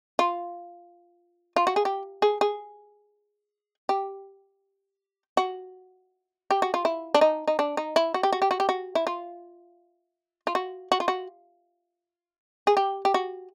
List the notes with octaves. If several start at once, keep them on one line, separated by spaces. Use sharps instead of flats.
F4
F4
F#4
G#4
G4
G#4
G#4
G4
F#4
G4
F#4
F4
E4
D4
D#4
D#4
D4
D#4
E4
F#4
G4
F#4
G4
F#4
G4
F#4
E4
F4
F4
F#4
F#4
F4
F#4
G#4
G4
G4
F#4